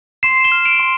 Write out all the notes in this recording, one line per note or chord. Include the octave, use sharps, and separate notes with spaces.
C6 C7 E7
E7 G7
F6
D7 F7
C6